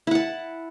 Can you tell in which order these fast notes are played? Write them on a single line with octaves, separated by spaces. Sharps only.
E4 F#5 A5